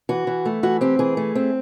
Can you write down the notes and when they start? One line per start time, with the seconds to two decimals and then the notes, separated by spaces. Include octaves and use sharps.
0.09 E3 F#4
0.27 E3
0.46 A3
0.63 E3 F#4
0.81 C4 G4
0.99 E3 G#4
1.17 A3
1.35 C4